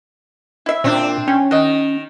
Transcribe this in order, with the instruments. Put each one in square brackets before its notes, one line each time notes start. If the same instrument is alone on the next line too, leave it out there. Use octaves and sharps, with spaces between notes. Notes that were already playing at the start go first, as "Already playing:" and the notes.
[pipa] E4 E5
[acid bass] A#2 [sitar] C4 D4
[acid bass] C#4 [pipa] G5
[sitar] D#3 [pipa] F#4 D#5